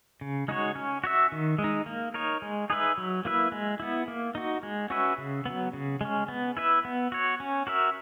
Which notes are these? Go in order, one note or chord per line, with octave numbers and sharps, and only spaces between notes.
C#3
G#3 D#4 F#4 C#5
C#4
F#4 C#5 E5
D#3
G#3
D#4
A#3
D#4 A#4 C#5
G#3
D#4 G#4 B4 E5
F#3
A#3 E4 B4 E5
G#3
B3 E4
A#3
D#4 F#4
G#3
C#4 F#4 B4 E5
C#3
F#3 B3
C#3
G#3 C#4
B3
E4 B4 E5
B3
F#4 C#5
C#4
F#4 A#4 E5